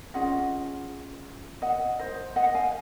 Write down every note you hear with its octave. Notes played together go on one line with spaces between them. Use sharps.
C#4 F4 G#4 D#5 F#5
D#5 F#5
C5 D#5
D#5 F#5
F5 G#5